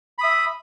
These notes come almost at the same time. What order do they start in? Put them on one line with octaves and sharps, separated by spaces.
B5 D#6 E5